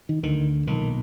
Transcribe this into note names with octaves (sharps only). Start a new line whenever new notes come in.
D#3
D2 D3 D#3
B1 A#2 D#3